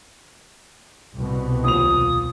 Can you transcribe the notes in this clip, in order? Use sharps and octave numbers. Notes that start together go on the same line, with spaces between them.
C2 B2
D#2 F3 D#6 F7